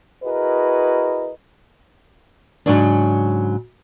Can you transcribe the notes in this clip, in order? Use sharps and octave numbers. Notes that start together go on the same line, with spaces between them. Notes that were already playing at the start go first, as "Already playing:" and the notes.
E4 F#4 G#4 A#4 B4 D#5
G#2 C#3 F#3 C#4 D4